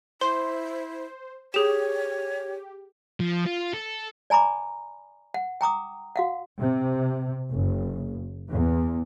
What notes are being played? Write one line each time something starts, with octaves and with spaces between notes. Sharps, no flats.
E4 C5 C6
G4 G#4 C#5 E7
F3
F4
A4
D5 G#5 A#5 B5 D6
F#5
G5 A#5 D6 D#6
F#4 F5 F#5
C3
F#1
E2